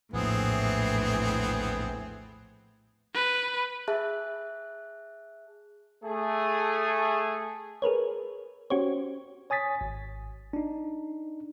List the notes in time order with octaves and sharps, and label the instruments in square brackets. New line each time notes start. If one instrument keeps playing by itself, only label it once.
[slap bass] A#1 E2 [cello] A2 E3 [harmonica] B3 C4 G#4
[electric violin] B4
[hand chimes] G#4 E5 A5 F#6
[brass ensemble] A3 G#4
[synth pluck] G#4 A#4 B4 C#5
C#4 F#4 G4 C5 C#5
[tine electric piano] C#5 G#5 D#6 A6 B6
G#1
D4 D#4